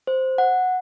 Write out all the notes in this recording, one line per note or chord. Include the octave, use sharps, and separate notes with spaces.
C5
F#5